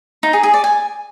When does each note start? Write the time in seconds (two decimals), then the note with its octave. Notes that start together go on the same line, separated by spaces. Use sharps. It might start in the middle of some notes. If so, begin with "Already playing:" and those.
0.23 D#4
0.33 G#4
0.43 G#4
0.54 D5
0.64 G#5